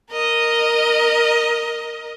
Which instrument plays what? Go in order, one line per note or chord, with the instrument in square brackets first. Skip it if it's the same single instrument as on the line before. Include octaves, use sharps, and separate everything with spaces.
[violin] A#4 D#5